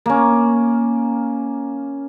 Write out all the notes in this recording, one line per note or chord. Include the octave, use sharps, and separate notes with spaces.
A#3 C#4